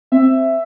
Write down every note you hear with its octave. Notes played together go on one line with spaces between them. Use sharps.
C4 E5